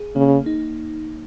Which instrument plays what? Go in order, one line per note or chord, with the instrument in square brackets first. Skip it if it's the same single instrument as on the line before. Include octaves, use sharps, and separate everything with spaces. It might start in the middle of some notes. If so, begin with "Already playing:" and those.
Already playing: [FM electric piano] G#4
[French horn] C#3 [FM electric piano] A#3
[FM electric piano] D#4